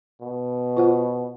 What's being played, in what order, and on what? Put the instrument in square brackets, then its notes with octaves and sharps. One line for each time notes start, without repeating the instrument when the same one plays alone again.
[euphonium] B2
[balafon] F4 C5 F#5